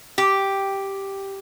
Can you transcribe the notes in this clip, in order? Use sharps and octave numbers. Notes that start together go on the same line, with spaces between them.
G4